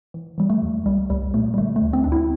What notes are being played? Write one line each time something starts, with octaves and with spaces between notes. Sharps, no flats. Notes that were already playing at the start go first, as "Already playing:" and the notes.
E3
E3 G3
A3
E2
C2 G3
C2 G3
A#2 A3
G3
D3 A3
A3
D2
C4
D2 D4
E4